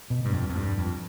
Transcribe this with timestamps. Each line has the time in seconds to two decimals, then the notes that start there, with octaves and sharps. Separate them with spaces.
0.10 B2
0.25 G2
0.33 F2
0.50 F2
0.56 G2
0.78 F2